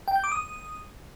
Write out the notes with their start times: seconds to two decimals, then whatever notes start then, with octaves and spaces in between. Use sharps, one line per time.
0.08 G5
0.16 G6
0.24 D6
0.32 D#6